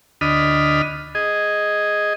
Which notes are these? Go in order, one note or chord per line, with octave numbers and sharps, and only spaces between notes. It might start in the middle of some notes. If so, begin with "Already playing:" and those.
D2 D4 D#5 B5 D#6 F6
G#4 D#5